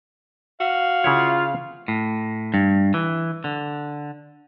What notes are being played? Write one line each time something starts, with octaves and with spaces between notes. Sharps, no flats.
F#4 F5
C#3 E4 F4 C#5
A2
G2
E3
D3